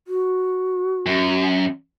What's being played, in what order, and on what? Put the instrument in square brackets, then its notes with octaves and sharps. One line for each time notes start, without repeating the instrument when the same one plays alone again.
[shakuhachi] F#4
[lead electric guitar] F#2